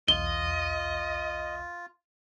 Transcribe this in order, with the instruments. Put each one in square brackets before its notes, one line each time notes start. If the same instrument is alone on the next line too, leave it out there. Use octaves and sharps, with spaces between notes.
[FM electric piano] B1 E2 [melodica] F4 [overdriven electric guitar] D#5 [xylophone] G7